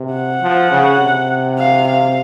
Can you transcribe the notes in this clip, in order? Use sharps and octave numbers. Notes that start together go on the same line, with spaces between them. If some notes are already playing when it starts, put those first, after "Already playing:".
Already playing: C3
F#5
F3
C#3
C3
F5
F5